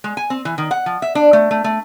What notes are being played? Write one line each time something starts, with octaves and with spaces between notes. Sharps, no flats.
G#3
G#5
C4
E3
D#3
F#5
F3
E5
D4
A3
A3
A3